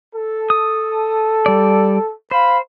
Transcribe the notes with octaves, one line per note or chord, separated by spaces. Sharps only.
A4
D#6
G3 D5
C5 F5 B5